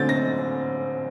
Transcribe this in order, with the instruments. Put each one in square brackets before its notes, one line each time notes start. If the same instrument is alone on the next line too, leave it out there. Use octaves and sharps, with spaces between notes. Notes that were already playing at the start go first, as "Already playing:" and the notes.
Already playing: [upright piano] D3 A3 C4 G6 A6
A#6